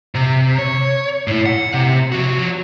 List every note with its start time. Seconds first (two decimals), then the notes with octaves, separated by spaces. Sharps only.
0.15 C3
0.58 C#5
1.28 A2 E4
1.46 F#5
1.74 C3
2.12 F3 F#4